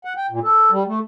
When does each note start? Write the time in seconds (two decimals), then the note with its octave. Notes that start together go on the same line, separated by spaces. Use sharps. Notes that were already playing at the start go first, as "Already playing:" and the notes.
0.05 F#5
0.17 G5
0.31 A#2
0.44 A4
0.71 G3
0.87 A3